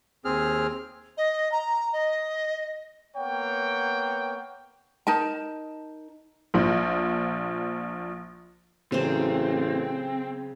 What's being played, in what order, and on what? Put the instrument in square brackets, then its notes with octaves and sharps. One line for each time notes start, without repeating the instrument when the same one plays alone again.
[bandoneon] D#2 C4 G#4 F6
[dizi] D#5
A#5
D#5
[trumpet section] A#3 B3 C#5 F#5 G5
[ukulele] D#4 A#4 A5
[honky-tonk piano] A#1 F3
[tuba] A1 [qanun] C#3 F#3 C5 [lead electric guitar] C4